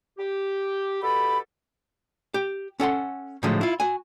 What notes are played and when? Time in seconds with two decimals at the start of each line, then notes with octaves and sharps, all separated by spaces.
0.18 G4
1.03 B2 G4 A4 B5
2.34 G4
2.80 C#4 A4 F#5 C6
3.43 A2 D3 F3 F#3 G#3 A3
3.61 E4 F4
3.80 F#4 G#5